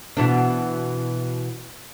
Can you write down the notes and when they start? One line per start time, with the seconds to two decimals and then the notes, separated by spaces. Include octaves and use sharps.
0.17 B2 E3 D4